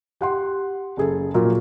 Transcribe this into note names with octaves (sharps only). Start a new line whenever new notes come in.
G4 F#5 C6
F#1 G#4 A4
A#2 F3 F#3 A#4